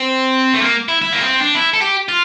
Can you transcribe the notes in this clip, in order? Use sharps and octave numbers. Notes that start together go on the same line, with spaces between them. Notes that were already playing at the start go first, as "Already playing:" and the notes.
Already playing: C4
A3
A#3
E4
E4
A#3
C4
D4
E4
A4
G4
F4